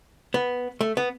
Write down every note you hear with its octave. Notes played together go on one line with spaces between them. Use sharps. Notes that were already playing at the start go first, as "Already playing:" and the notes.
B3
A3
B3